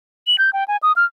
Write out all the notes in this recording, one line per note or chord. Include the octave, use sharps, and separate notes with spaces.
F#7
G6
G5
G#5
D#6
F6